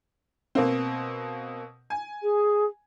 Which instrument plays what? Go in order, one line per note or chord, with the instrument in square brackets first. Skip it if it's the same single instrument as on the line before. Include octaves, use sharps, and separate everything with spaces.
[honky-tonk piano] B2 A#3 C4
G#5
[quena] G#4